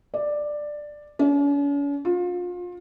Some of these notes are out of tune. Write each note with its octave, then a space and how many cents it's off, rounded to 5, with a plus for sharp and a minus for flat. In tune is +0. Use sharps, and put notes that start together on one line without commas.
D5 +10
C#4 +45
F4 +30